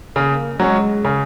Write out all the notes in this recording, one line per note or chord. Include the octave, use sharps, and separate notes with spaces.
C#3 A#3
F#3 G#3 C#4
C#3